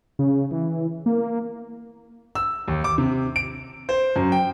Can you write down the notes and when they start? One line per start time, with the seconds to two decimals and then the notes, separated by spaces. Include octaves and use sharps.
0.19 C#3
0.51 E3
1.06 A#3
2.35 E6
2.68 D#2
2.84 D6
2.98 C3
3.36 D7
3.89 C5
4.16 F#2
4.32 G5